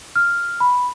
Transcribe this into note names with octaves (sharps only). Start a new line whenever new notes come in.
F6
B5